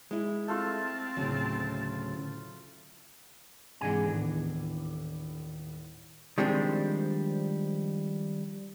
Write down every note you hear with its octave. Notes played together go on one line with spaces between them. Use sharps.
G#3 E4
A3 C4 F4 A5
D2 A2 C#3 F#3
G#2 C3 E3 G#3 D4 G#5
D#1 A2 B3
D#3 F3 G3 G#3 C4 D4